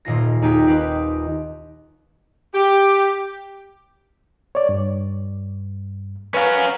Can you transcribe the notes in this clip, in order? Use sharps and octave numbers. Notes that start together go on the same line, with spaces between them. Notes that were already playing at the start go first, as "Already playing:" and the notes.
D#1 A#2 F4 A#6
D#2 D#4 G4 G#4 B6
C4 D#4 G4 B4
G4
C#5 D5
G2
C#4 A#4 B4 F5